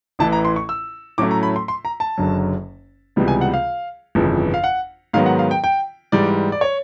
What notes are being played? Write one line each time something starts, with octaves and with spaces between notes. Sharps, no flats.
A1 A2 E3 A5
A#5
C6
C#6
E6
A2 F#3 A3 C#4 E4 D6
A#5
B5
C6
C6
A#5
A5
F#1 F#2 D3 F#3
C#2 C3 E3 G3 B3
G#5
F#5
F5
G1 F2 C#3 E3
F5
F#5
G#2 D#3 F#3 B3 F5
F#5
F5
G5
G5
G#2 E3 G3 D5
D5
C#5